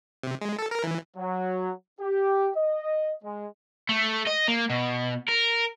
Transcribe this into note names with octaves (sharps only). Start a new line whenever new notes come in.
C3
G#3
A4
A#4
E3
F#3
G4
D#5
G#3
A3
D#5
A#3
B2
A#4